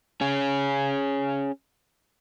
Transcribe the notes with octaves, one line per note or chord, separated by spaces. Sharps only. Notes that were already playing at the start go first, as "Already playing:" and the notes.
C#4 G#4